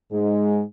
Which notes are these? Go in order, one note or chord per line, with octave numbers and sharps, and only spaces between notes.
G#2 G#3